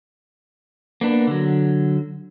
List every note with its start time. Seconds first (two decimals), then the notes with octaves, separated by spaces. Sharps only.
1.01 A#3 B3 D4
1.27 D3 F#3